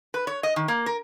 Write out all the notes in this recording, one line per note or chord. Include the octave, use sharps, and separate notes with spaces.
B4
C#5
D#5
D#3
A#3
A#4